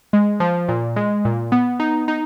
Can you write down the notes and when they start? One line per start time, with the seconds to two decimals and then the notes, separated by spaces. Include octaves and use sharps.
0.13 G#3
0.40 F3
0.68 A#2
0.96 G#3
1.25 A#2
1.52 B3
1.80 D#4
2.08 D#4